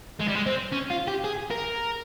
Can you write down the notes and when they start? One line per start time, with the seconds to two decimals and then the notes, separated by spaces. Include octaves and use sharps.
0.21 G#3
0.28 G3
0.36 G#3
0.46 C4
0.72 C#4
0.90 F4
1.07 G4
1.24 G#4
1.51 A#4